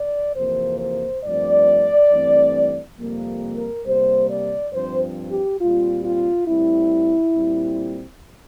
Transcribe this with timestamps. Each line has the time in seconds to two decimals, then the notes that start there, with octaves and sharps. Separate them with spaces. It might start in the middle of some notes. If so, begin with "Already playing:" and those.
Already playing: D5
0.36 F2 C3 E3 A#3 C5
0.80 C5
1.23 G2 F3 A3 C4 D5
2.11 G2 E3 A3 C4
2.98 F2 C3 G3 A#3
3.57 A#4
3.85 C3 G3 A#3 C5
4.29 D5
4.73 G2 F3 C4 C5
5.31 G4
5.60 A#2 G3 C4 F4
6.04 F4
6.47 A2 G3 C4 E4
7.34 A#2 G3 C4